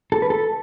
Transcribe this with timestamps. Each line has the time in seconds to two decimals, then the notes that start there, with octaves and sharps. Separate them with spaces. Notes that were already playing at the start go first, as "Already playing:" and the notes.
0.12 A4
0.22 B4
0.30 A4